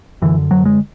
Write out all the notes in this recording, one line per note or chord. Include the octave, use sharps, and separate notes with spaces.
F#2 D3 E3
F#3
G#3